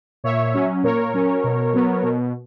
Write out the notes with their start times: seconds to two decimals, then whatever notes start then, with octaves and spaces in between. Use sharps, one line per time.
0.24 A#2 C#5 E5
0.54 F#3 C#4
0.83 A#2 A#4 C#5
1.14 F#3 C#4
1.44 B2
1.73 F#3 B3
2.03 B2